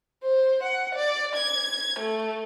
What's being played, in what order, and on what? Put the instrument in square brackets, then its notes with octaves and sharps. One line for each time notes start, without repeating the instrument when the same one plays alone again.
[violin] C5
F#5
D5
G#6
A3